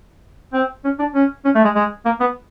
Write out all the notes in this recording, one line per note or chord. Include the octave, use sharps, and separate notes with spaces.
C4
C#4
D4
C#4
C#4
A3
G#3
G#3
A#3
B3